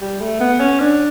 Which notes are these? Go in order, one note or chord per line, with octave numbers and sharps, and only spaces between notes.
G3
A3
B3
C#4
D4